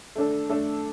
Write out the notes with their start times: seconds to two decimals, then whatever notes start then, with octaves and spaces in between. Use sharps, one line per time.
0.16 A3 D4 A4
0.50 A3 D4 A4